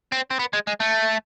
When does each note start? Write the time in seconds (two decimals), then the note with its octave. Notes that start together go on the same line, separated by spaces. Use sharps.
0.12 C4
0.31 C4
0.39 B3
0.53 G#3
0.67 G#3
0.80 A3